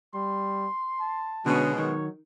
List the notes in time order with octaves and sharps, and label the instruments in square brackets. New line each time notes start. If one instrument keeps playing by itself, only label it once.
[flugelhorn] G3 [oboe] C6
[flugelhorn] A5
[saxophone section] B2 G#3 [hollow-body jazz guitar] D3 C#4 [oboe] F#4
[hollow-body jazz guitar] D#3 [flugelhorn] F#3 [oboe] C#5